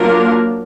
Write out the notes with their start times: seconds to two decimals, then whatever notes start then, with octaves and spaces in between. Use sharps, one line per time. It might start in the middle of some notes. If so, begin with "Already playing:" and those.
Already playing: F#3 A#3 D4 F4 A#4